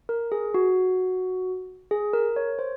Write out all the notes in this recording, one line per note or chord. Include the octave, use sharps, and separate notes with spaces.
A#4
G#4
F#4
G#4
A#4
C#5
C5